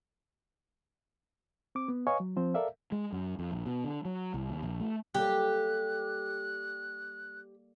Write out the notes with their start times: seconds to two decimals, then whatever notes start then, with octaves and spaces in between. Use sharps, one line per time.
1.75 C4 D6
1.88 B3
2.07 B4 C#5 D#5 F5 G#5 C#6
2.20 F#3
2.36 F3 C4 C5
2.54 A4 A#4 D5 E5 F5
2.92 G#3
3.13 F#2
3.39 F2
3.52 A#1
3.66 B2
3.84 D3
4.05 F#3
4.34 C2
4.50 D#2
4.63 A#1
4.80 A3
5.14 G3 A#3 G4 A4 F#6